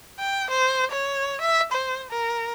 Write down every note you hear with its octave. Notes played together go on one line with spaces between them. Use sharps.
G5
C5
C#5
E5
C5
A#4